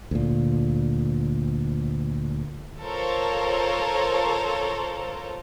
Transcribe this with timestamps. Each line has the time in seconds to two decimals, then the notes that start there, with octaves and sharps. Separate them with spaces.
0.11 D2 A#2
2.80 F4 A4 A#4 C5 C#5